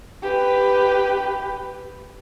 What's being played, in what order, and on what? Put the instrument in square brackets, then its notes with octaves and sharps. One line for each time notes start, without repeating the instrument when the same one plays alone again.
[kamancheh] G4 B4